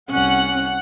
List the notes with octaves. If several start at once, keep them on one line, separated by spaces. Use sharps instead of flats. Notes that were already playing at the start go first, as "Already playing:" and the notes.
C2 C#4 F#5